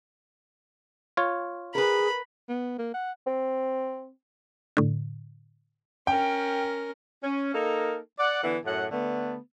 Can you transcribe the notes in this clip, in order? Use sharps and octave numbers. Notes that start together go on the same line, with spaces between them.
F4 C#5
G#4 A#4 B4 B5
B3
A#3
F#5
C4
A2 D3
C#4 A#4 G5
C#4
A#3 D#4 A4 A#4
D5 F#5
D3 E3 B3 E4
F#2 A2 F#5
D3 A3 B3